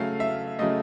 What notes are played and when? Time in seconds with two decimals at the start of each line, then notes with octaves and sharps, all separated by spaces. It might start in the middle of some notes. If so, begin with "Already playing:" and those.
Already playing: C#3 F#3 A3 F5
0.20 E5
0.59 C#3 F#3 A3 D#5